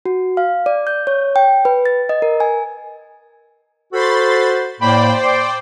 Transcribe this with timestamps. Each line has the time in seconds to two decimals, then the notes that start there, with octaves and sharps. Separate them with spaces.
0.05 F#4
0.37 F5
0.66 D5
0.87 G6
1.07 C#5
1.36 G5
1.65 B4
1.86 A6
2.09 D#5
2.22 A#4
2.40 G#5
3.93 F#4 A4 C5 B5 C6 A6
4.81 A2 A#3 C5 D5 G5 B5
5.23 C6 D6